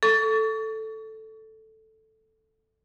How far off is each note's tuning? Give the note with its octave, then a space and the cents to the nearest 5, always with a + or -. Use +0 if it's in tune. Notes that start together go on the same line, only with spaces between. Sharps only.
A4 +0 C#6 +35